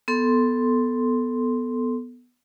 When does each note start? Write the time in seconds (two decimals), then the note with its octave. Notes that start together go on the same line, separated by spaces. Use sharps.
0.08 B3 A4 C6